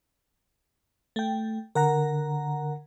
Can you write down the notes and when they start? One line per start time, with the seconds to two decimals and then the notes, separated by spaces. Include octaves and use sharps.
1.16 A3 G5
1.75 D3 A#4 F#5 A#5